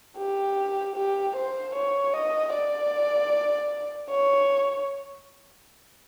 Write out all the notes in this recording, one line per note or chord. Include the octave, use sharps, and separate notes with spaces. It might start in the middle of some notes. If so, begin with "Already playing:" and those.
G4
G4
C5
C#5
D#5
D5
C#5